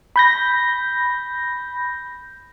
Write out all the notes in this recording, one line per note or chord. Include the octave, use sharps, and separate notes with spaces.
B5 G6 A#6